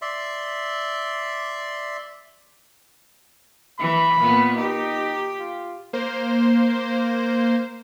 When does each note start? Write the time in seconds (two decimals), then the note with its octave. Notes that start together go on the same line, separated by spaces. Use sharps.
0.02 D5 E5 C6
3.79 E3 B5
4.20 A#2 B3
4.56 D#4 G4
5.40 F4
5.93 A#3 C5